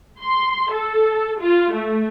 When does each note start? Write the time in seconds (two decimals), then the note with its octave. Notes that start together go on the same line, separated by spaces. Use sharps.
0.20 C6
0.72 A4
1.41 F4
1.72 A3